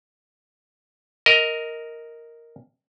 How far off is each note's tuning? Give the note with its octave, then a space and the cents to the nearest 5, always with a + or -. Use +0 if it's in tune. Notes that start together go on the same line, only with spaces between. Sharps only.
A#4 -5 D#5 +10